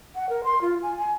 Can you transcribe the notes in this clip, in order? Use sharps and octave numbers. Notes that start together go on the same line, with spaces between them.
F#5
A#4
C6
F4
G#5
G#5